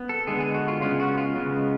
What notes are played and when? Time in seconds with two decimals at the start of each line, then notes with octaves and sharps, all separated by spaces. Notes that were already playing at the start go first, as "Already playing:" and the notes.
Already playing: B3
0.09 A4
0.27 D3 G#3 B3 G#4
0.40 G#4
0.55 F#4
0.68 F4
0.81 C#3 G#3 B3 F4
1.00 F#4
1.17 F4
1.36 C#3 G#3 B3